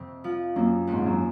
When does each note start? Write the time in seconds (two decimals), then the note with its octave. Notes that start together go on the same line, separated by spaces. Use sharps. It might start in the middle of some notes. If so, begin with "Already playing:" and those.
Already playing: F2 C3
0.24 F3
0.56 F#2 A#3
0.87 D#2
0.93 G#2
1.06 F#2